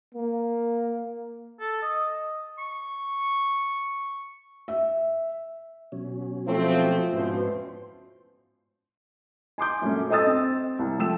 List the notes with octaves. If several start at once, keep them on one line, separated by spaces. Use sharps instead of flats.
A#3
A4
D#5
C#6
E5
B2 F#3 C#4
F3 A3 C4
G#2 B2 E3 F3 C#4 C5
G#5 C6 D6 G6
F#2 A#2 A3 C#4
A4 C5 D#5 D#6 E6 A6
C4
C2
F3 A3 G5 E6 E7